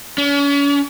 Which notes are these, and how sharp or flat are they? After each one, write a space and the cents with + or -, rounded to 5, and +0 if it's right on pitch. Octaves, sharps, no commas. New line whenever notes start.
C#4 +40